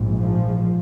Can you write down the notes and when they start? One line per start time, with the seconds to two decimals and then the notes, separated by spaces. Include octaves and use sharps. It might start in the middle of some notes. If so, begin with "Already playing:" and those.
Already playing: A#1 G#2
0.18 F3